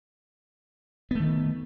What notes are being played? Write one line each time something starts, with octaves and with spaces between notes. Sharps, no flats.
D#3 A3 B3